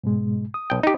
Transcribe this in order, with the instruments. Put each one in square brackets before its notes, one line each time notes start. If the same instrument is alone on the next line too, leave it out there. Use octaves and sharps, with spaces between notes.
[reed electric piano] G#2 B2 G#3
D#6
[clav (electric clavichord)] B1 G5
D#4 G4